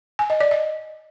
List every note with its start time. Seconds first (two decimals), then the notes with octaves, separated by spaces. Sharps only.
0.19 G#5
0.30 D#5
0.40 D5
0.51 D#5